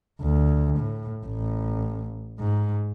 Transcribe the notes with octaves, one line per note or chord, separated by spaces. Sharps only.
D2
A2
A1
G#2